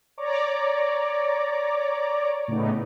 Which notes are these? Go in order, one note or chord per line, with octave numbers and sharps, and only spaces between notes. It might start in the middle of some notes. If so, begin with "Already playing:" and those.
C#5 D5 A#5 D6
A2 C#3 A3 B3 D#4